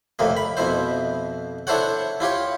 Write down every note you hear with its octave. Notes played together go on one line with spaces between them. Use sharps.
F2 A2 C3 A#3
B5
F2 B2 E4 C5
D4 E4 A4 C5 C#5 F#5
E4 F4 G4 C#5